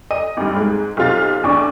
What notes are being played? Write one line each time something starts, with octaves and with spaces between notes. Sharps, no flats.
D#5 D#7
G#1 G2
G#2 G#3
B1 C3 F4 A6
A1 E2 D4 C#6 D6